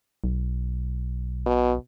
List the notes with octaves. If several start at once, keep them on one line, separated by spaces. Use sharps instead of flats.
B1
B2